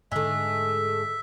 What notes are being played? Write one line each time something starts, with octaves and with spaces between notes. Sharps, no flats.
G#2 D3 G#3 A3 E5